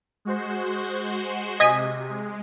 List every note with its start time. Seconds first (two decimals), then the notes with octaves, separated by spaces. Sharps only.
0.25 G#3 F#4 C5
1.60 C3 D#5 G#5 B6
2.09 G#3